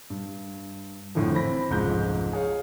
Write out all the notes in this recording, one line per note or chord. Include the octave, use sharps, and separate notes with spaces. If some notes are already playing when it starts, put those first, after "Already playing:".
G2
G#1 F2 A2 D3 E3 F3
E3 C4 B5 A#6
F1 C#2 G#2 F3 G6
G#4 C#5 F5